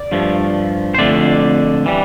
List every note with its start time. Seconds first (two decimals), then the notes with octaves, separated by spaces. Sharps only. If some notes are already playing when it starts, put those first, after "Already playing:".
Already playing: D5
0.12 G2 F3 A3
0.95 C5
0.98 F2 D3 A3 D5
1.86 E3 G3